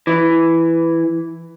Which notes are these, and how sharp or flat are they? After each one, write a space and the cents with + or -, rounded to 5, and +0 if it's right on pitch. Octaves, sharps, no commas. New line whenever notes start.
E3 +5